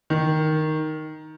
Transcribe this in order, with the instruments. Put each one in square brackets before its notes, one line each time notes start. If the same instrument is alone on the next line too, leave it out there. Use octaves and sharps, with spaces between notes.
[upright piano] D#3